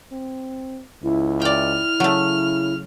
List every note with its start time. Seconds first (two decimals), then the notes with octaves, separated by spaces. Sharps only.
0.11 C4
1.03 C#2 E4
1.42 D5 G5 F6
2.00 C#3 F#3 A3